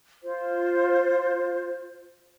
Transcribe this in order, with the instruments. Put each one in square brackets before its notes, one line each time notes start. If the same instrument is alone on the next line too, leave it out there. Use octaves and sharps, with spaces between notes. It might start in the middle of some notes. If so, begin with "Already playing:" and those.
[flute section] F4 C5